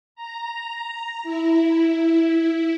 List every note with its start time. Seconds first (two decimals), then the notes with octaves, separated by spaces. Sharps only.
0.15 A#5
1.23 E4